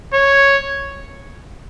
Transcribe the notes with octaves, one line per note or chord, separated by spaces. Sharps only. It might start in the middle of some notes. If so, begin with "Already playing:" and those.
C#5